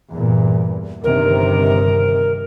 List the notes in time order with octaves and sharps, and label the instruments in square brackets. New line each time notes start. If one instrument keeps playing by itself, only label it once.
[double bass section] E2 G2 A#2
[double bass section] G1 C3 D#3 [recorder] A#4